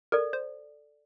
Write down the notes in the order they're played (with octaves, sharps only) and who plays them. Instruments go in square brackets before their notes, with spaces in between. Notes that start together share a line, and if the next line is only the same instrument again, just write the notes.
[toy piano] A4 D5 [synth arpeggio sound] A#4
[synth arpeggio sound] C5